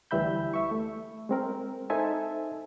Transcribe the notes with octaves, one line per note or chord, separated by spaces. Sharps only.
D2 E3 G3 E5 B5 G6
E5 C#6
A3
G#3 C4 A#4
D#4 A4 C5 E5 G#5 A5